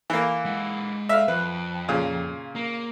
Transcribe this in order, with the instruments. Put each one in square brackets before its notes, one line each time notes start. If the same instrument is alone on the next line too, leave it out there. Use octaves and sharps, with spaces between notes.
[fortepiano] E3 A#3
[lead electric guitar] G#3 F#5
[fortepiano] E5 F5 F6
[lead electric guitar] F2 [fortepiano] B4
[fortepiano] A#2 C#3
[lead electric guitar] A#3